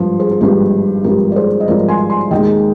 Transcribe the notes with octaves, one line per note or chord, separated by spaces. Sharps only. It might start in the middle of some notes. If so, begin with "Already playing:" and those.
Already playing: G#1 G2 F3
G#4 C5
F4
G#1 G2 F3 G4
G#1 G2 F3 G4 A#4
D5
G#4 C5
D#5
G#1 G2 F3 A#4 D5
G#5 C6
G#5 C6
D#2 D#3 G#3 D#5 G5